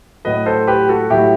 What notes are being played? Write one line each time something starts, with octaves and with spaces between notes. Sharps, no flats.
A2 F#3 B4 D#5
A4 C5
G4 B4
F#4 A4
A2 F#3 E4 G4